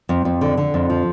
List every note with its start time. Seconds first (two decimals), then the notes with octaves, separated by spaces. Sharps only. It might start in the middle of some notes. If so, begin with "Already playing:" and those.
0.09 F2
0.25 F2
0.41 D3
0.57 D3
0.74 F2
0.90 F3